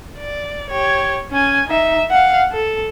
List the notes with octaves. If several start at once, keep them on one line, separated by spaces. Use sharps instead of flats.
D5
G4 C#5
C#4 G#5
D#4 E5
F5 F#5
A4